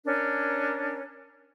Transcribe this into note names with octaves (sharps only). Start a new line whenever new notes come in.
C#4 D4 A#4